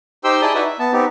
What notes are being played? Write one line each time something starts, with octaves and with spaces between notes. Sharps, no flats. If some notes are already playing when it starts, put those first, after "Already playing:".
D#4 G4 C5 G5 C6 E6
E4 G#4 D5 G5 A5 D#6
D#4 E4 F#4 B4 D5 E5
E5
B3 A5
B3 C4 D#4 G4